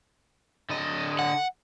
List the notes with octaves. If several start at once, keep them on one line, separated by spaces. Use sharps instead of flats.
D3 D#5
F#5